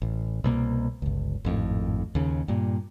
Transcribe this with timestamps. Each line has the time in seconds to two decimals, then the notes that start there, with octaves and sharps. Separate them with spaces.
0.02 A1
0.44 C2 B2 A#3
1.02 G1 C#2
1.45 G#1 F2 A2
2.15 D#2 C#3
2.48 G2 A#2